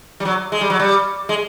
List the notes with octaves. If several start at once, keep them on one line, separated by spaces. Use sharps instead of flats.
G3
F#3
G#3
G3
F#3
G3
G#3